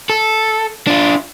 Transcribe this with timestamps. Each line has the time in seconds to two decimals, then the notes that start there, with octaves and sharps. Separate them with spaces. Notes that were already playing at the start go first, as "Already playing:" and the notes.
0.10 A4
0.87 D4 F4